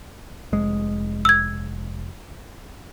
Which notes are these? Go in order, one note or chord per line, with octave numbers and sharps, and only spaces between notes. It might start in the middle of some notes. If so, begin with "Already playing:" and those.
F1 G#3
E6 G#6